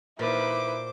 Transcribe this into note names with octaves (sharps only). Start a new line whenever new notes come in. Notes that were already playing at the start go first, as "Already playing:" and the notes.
A#2 D#4 E4 B4 C5 D6